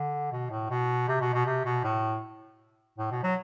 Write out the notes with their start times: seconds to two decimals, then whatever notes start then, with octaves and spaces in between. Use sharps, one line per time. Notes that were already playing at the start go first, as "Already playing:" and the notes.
Already playing: D3
0.32 B2
0.51 A2
0.70 B2
1.08 C3
1.20 B2
1.33 B2
1.46 C3
1.65 B2
1.84 A2
2.98 A2
3.11 B2
3.23 F#3